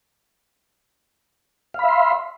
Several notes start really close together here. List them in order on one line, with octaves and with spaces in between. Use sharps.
F5 B5 E5 C6